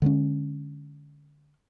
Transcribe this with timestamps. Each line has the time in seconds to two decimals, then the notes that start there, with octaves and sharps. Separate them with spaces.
0.02 D3 G#3 A#3 C#4